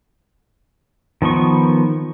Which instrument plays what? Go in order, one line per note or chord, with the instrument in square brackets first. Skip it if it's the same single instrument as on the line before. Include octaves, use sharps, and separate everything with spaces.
[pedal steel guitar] D#3 F3 B3 C#6